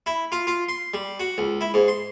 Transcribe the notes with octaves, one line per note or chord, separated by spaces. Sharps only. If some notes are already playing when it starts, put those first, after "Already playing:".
E4
F4
F4
C6
G3
F#4
C#2
E4
G#2
C6